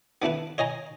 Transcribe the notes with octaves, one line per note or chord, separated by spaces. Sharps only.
B3 D4 E4 B4
C#5 D#5 G#5 A#5